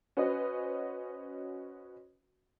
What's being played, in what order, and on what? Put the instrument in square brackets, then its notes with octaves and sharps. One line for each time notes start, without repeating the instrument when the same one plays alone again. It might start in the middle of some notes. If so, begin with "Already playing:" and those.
[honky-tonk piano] C#4 F#4 B4 C5 D#5